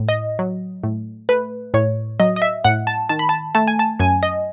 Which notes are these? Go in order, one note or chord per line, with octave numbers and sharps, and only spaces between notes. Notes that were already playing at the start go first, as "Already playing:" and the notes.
Already playing: A2
D#5
F#3
A2
A3 B4
A2 C#5
F#3 D#5
D#5
E5
A2 F#5
A5
D#3 A5
B5
A5
A3 A5
G#5
A5
F#2 G#5
D#5